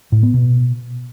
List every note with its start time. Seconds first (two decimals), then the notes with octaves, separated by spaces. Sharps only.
0.12 A2
0.23 B3
0.34 B2